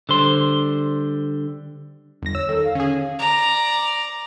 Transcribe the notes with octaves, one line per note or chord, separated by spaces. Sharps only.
D3 G3 C5 C6
G1 E2 A#6
C#5 E6
D#3 A4
F5
D3 C#4 G#4
D5 A#5